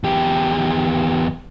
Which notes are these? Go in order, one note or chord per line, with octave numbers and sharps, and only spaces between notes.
E2 G4